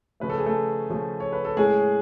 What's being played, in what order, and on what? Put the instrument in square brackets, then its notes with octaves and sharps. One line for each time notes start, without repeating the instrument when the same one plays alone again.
[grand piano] C#3 F3 A3 B4
A4
G#4
A3 A4
C#3 F3 A3
C#5
B4
A4
A2 G#3 C#4 G#4